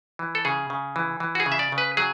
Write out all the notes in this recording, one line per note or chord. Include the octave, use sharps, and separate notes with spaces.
E3
A4
C#3 G#4
C#3
E3
E3
F#4
G#4
C#3
E5
D5
C#3
B4
F#3 G#4